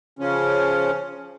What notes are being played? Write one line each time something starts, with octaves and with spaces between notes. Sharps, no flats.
C#3 F3 C#4